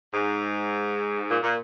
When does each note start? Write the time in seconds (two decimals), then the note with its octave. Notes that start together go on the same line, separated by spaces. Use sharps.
0.14 G#2
1.30 A#2
1.43 A#2